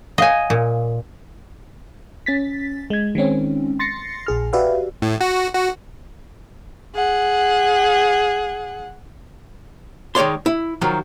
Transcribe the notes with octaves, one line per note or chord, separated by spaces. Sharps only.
C#5 D#5 F5 F#5 G#5
A#2
C#4 A6 B6
G#3 G#6
D#3 G#3 C4 C#4
C6 A6 A#6 C7 C#7
A#1 G#4 F6
F#4 G4 B4 D5 E5 F5
A2
F#4
F#4
G#4 F#5
D#3 G#3 C#5 D5 C6
E4
D#3 F3 F#3